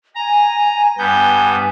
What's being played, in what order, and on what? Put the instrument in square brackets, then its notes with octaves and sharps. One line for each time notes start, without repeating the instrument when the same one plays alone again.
[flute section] G#5 [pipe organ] A#5
[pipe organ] G2 B3 G6 [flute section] G#5